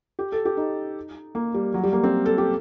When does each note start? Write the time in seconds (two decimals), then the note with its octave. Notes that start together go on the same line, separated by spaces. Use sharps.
0.19 G4
0.32 A4
0.45 G4
0.57 D#4
1.35 A#3
1.54 G3
1.74 F#3
1.84 G3
1.93 A#3
2.04 C4
2.26 A4
2.38 G4